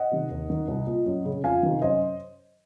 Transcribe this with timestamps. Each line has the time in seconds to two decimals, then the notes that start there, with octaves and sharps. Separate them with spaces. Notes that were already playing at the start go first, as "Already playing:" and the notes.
Already playing: D#5 F#5
0.11 C3 D#3
0.31 D#2
0.50 D#3
0.68 C2
0.87 A#2
1.06 F#2
1.25 C#3
1.44 F2 F5 G#5
1.63 C3 D#3
1.82 F#2 C5 D#5